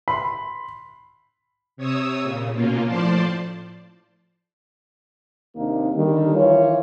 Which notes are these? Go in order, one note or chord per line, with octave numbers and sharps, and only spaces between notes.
B5 C6
C3 C#5 D#6 E6
A#2 C#3
B2 A#3 C#4 F4
A2 F3 C5 D5 A5 C6
D#2 C3 A#3 D4 D#4
D3 D#3 G3
D#3 E3 F4 C#5